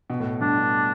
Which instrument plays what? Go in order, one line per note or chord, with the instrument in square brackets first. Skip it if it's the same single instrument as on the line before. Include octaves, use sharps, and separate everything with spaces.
[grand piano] B2
A2
[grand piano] G2 [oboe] D4
[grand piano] G2